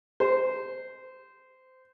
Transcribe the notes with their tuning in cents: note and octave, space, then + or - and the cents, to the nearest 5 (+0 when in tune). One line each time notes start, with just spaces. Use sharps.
C5 -20